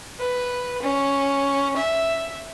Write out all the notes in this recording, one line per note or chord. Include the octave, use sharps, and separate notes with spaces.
B4
C#4
E5